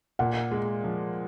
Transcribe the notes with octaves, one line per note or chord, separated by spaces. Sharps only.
A#2 F#5
G#3
F3